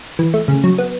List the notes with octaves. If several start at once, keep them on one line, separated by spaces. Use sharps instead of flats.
E3
A3
C#3
F#3
B3